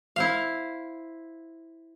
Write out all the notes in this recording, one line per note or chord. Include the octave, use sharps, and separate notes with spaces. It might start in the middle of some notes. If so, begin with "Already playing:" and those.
E4 C5 F5